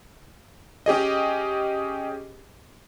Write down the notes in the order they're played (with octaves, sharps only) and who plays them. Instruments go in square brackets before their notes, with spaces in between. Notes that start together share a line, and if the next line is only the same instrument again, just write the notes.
[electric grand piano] C#4 G4 G#4 D#5